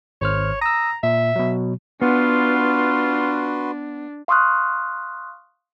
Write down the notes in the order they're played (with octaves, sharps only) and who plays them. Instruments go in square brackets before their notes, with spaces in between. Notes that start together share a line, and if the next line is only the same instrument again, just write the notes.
[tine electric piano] G#1 C5 F6 [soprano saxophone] C#5
[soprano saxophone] A#5 [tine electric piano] D#6 E6
[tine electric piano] A#2 [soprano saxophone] E5
[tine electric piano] B2 F#3
[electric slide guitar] B3 [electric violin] D4 [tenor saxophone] F4 [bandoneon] F#4 B4 C6
[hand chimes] F5 C6 C#6 D#6 F6 F#6